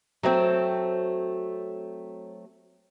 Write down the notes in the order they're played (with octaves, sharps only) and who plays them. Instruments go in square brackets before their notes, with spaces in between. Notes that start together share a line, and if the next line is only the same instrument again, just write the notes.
[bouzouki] F#3 A3 C4